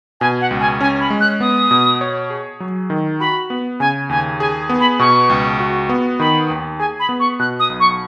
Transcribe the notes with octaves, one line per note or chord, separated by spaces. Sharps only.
B2 G#5
F#5
C#2
G#5
C#4 G#5
B5
G#3
F#6
B3 D#6
B2
C#5
G#4
F#3
D#3
F#4 B5
B3
C#3 G#5
D#2 G#5
G#4 G#5
B3
B5
B2 C#6
C#2
F#4
B3
D#3 B5
D#2
G#4 G#5
B5
B3
C#6
B2 F#6
D#6
B1
C#6